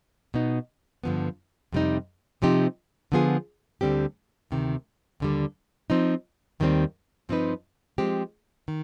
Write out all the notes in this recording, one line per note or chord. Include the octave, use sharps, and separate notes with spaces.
B2 B3 D#4
G2 D3 F3 B3
F2 C3 G3 C4 D#4
C3 F3 C4 D#4 G4
D3 F3 B3 F4 G#4
D2 D3 G3 C4 G4
D2 C3 D#3
D#2 D3 G3
F3 C4 D#4
D#2 D#3 G3 C4
G2 F3 C4 D#4 B4
F3 G#3 C4 G4
D#3